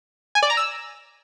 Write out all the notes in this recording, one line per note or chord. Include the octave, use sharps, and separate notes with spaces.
G#5
D5
A#5
E6